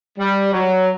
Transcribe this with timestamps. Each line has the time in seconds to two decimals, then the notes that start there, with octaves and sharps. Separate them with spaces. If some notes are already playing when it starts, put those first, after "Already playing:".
0.19 G3
0.53 F#3